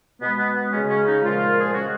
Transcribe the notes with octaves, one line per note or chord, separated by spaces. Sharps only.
B2 G#3 B3
B3
B3
C#3 G#3 C#4
C#4
D#4
A#2 F3 G#3 F4
A#4
G#4
C#3 G#3 F#4